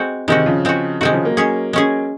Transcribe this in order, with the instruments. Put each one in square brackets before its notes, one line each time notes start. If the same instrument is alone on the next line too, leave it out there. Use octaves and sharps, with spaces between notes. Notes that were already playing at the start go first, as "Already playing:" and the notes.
Already playing: [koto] G#3 C4 F#4
[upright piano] C3 D#3 [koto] G#3 C4 F#4
[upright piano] C#3 F3
[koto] G#3 C4 F#4
[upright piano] C3 D#3 [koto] G#3 C4 F#4
[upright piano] C#3 F3
F#3 A#3
[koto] G#3 C#4 G#4
G#3 C#4 G#4